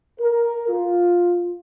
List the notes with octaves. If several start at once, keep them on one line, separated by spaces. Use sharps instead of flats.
A#4
F4